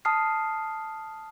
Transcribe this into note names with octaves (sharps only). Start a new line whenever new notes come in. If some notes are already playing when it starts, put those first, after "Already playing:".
A5 D#6 F6 C7